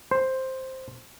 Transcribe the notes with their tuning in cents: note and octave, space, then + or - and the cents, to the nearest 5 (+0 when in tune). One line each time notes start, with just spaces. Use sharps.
C5 +5